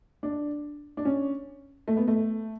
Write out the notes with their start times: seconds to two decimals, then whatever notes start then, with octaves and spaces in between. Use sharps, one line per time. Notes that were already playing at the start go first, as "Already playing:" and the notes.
0.23 D4
0.97 D4
1.05 C#4
1.88 A3
1.97 B3
2.08 A3